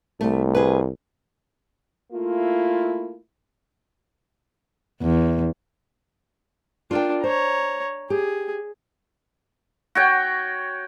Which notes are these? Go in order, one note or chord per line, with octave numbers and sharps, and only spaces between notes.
C2 A3
G#4 B4
A3 A#3 E4 F4
E2
D4 F4 A#4 G5
C5 C#5 A#5
G4 G#4
F#4 C#5 G5